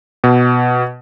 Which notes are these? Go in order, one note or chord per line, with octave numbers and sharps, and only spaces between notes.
B2